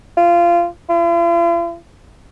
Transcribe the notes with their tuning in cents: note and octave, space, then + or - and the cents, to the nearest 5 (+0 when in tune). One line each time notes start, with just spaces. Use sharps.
F4 -20
F4 -45